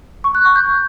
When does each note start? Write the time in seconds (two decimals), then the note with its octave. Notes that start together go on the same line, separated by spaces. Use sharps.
0.24 C#6
0.35 F#6
0.45 C#6
0.55 G6